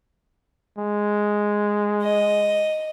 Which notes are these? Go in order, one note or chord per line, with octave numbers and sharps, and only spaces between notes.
G#3
D#5